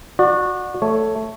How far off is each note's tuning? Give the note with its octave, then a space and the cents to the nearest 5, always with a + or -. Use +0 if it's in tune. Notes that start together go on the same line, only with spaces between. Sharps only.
F#4 -20 D5 +25
A3 +0 C#5 +5